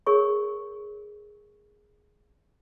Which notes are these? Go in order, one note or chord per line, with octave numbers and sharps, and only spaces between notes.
G#4 A#4 C#5 C#6